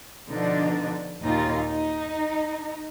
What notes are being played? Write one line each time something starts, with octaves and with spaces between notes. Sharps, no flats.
B2 D3 F3 D4 D#4
D#2 A#2 D#4 F4
D#4